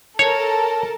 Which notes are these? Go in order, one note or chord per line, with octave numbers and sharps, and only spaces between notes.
A4 A#4 C#5 A5